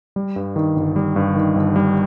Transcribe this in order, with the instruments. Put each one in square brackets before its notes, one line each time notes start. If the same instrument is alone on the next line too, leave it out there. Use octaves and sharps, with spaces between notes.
[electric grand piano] G3
G2
D#3
G1
G3
G2
D#3
G1
G3